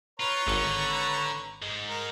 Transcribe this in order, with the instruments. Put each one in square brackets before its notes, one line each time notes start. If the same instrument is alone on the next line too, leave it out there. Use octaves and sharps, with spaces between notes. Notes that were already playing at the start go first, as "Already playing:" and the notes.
[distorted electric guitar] F4 [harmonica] B4 C#5 A#5
[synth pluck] G#1 C#7 [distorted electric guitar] D3
[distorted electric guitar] G#2 G#3
[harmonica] A#4